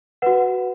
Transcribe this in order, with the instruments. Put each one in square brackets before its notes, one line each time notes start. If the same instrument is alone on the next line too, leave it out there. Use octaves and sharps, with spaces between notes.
[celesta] F#4 B4 F#5